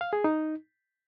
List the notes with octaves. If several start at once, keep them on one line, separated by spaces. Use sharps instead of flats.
F5
G#4
D#4